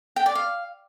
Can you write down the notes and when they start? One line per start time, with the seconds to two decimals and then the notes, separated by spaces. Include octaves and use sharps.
0.16 G5
0.26 D5
0.35 F5